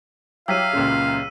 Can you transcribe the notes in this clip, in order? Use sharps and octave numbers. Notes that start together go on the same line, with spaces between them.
F#3 E4 G4 F5 E6 B6 D#7
C#2 A#2 C#3